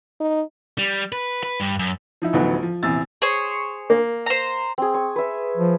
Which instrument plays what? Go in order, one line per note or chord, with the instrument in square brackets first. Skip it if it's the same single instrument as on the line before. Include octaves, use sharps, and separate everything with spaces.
[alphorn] D#4
[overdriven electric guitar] G3
B4
B4
G2
F#2
[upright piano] F3 D#4 E4
A1 D2 F3 F#3 B3 D#4
F3
A#1 E2 C3 E6 A6
[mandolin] G#4 C5 C#5
[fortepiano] A#3
[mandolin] C5 A#5
[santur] C4 G#4
C#6
B4 E5
[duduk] F3